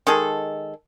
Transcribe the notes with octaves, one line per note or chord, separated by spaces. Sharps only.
D#3 G#3 G#4 A4